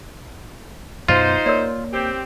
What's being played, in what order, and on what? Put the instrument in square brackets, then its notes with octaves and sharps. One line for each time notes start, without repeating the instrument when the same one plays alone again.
[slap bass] F#2 B2 [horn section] D#4 C5 [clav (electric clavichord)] F4
[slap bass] A#3 [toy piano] A#4 C#5 D5
[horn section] C4 G4